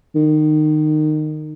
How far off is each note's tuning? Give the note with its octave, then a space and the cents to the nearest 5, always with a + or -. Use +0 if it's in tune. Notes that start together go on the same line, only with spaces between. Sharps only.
D#3 -25